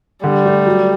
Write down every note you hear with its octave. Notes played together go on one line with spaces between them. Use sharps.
D3 G3
A3
F#3